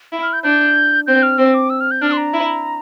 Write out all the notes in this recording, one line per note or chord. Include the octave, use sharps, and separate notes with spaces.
E4
F6
G6
D4 G6
C4 G6
F6
C4 E6
D6
E6
F6
G6
D4 F6
C6
A#5
E4